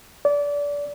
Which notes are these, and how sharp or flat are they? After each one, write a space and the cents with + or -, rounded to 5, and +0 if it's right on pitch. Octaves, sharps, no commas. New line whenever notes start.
D5 -25